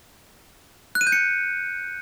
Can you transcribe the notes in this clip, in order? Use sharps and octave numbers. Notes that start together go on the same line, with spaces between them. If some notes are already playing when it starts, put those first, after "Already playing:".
F#6
D#7
G6
C#7